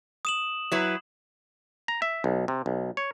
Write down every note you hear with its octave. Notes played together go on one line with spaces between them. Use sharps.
D#6 E7 F#7
F#3 E4 B4
A#5
E5
B1
C3
B1
C#5